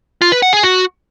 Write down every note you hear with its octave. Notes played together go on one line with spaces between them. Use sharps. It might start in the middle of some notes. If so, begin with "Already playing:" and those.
F4
B4
F#5
G#4
F#4